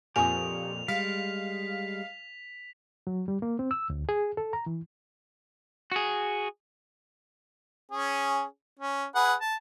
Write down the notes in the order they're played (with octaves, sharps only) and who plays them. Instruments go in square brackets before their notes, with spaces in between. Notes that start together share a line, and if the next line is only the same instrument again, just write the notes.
[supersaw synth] F2 A#2 [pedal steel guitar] G4 C#6 D#6 [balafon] G#5 [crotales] F7
[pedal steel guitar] G3 G#3 [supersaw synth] F5 [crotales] B6
[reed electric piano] F#3
G3
A#3
C4
E6
D2
G#4
A4
A#5
E3
[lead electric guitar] F#4 G#4
[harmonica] C#4 G#4
C#4
G#4 B4 F#5
A5